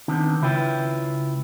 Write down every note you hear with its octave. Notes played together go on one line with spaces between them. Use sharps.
D#3 B3 C4 D4 D#4
C#2 C#3 E4 F4 B4 G5